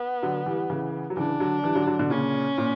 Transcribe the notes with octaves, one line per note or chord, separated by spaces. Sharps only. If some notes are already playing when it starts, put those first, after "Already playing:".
Already playing: B3
D3 F#3
E3 G3
C#3 E3
F#3
C#3 E3 D4
D3 F#3
E3 G3
D3 F#3
D3 F#3
B2 D3
A#2 C#3 C#4
A#2